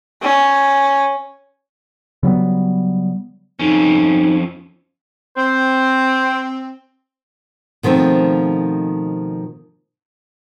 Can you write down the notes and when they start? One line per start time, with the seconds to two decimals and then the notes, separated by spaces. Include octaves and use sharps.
0.22 C#4
2.23 C#3 F#3 G3 B3
3.59 F2 C#4 D#4
5.37 C4 C5
7.83 B2 D#3 F3 A3 C4